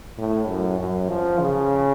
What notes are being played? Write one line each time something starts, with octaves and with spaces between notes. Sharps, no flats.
A2
F#2
F#2
F3
C#3